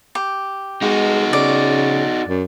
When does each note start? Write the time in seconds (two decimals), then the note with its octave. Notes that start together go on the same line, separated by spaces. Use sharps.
0.15 G4
0.82 G#3 D#4 F#4
1.33 C#3 D5
2.28 F#2